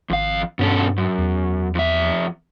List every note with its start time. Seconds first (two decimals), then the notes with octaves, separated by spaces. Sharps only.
0.10 G#1 F2 F5
0.59 G2 B2 C#4 A4
0.98 F#2
1.18 E2
1.75 F2 E5